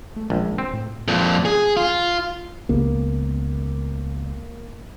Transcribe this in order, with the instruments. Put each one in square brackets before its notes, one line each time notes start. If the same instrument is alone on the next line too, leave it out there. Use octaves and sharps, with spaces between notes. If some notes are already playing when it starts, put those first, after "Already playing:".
[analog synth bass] A3
[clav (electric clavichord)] A#1 [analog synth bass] G#3
[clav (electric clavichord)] C4
[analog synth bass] A2
[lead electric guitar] F2 A#2
G#4
F4
[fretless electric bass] C#2 B3 [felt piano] A#3